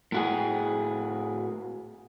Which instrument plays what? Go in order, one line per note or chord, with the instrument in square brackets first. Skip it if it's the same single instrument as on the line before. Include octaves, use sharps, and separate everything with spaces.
[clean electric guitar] A2 F#4 G#4